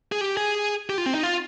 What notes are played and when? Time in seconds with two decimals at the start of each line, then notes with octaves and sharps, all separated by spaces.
0.12 G#4
0.21 G4
0.37 G#4
0.90 G4
0.98 F4
1.06 C4
1.15 D#4
1.23 F4